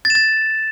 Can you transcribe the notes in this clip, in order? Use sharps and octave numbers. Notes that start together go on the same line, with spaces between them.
A6
E7
A6